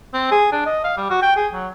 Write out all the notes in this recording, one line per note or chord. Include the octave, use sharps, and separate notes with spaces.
C4
G#4
D4
D#5
F5
G3
F#4
G5
G#4
F#3